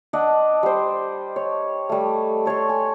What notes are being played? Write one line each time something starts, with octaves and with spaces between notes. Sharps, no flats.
D4 D5 D#5 F#5
G3 C5
C#5
G3 A3
A4 C#5 C6 C#6
G#5